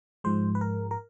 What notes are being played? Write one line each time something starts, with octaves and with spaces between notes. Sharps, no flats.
G#2 F3 G#3 C5
B4
A#4
A#4